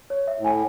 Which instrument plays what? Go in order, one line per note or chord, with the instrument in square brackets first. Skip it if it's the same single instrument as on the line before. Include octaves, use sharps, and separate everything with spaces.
[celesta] C#5
E5
[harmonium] A2
[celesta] G#5